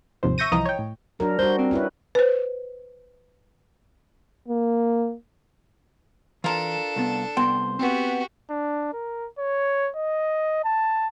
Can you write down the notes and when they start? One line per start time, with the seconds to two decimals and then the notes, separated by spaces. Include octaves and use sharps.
0.23 G#1 D#2 C3 F3 C5
0.38 E5 C#6 G6 A#6 D#7
0.52 C2 E3 F3 D#5 A#5
0.66 C#5 G5
0.79 A2
1.20 F#3 D4 A#4
1.39 G3 F#4 C5
1.58 C4
1.71 C#4 E4 B4
2.15 B4 C5
4.48 A#3
6.44 E3 D4 F4 A4 A#4
6.96 C2 B3
7.37 C2 B3 C5 G5
7.79 B3 C4 F#4 G4
8.50 D4
8.93 A#4
9.39 C#5
9.96 D#5
10.65 A5